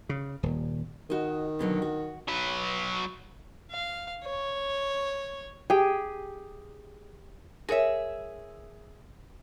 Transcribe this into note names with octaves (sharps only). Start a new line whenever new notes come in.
C#3
D#1
D#3 F#4 D#5
B2 D3 F#3
F#4
F#3 B4
F5
C#5
G4 G#4 G5
G#4 A#4 C#5 E5